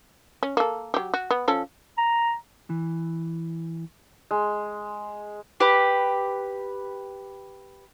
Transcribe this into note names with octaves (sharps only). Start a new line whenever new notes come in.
C#4
A#3 A4
F#3 G4
F#4
B3
F3 C#4 A4
A#5
E3
G#3
G4 B4